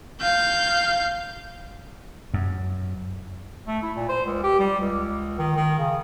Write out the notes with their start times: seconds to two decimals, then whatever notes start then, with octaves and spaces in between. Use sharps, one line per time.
0.21 F5 G6
2.34 F#2
3.67 A3
3.83 E4
3.96 A#2
4.09 C5
4.25 C#2
4.43 G4
4.60 G3
4.80 C#2
5.39 D#3
5.56 D#3
5.78 C#3